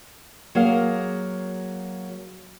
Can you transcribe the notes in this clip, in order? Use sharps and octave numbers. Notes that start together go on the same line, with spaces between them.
F#3 A#3 G#4 F5